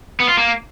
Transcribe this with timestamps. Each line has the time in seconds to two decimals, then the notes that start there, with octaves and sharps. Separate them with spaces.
0.20 B3
0.29 F4
0.37 A#3